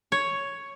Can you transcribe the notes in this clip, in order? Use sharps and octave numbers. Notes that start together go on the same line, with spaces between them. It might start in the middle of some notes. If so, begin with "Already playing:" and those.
C#5